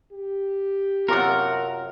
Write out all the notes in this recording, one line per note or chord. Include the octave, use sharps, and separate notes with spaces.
G4
F#2 C3 F4 A#4 F#5 A5